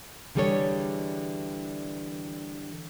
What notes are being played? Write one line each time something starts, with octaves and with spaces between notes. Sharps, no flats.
D3 E3 G3 G#4 A4 C#5